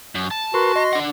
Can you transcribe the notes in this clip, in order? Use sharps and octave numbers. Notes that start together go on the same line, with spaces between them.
F#2
A5
F#4 A#4 B4 C6
D#5 C6 A#6
D4 F#5